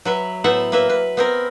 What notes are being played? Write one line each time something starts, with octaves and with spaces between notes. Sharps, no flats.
F#3 B4 E5
A2 B3 C5 E5 F#5
A#3 B4 E5
B4
B3 C4 A#4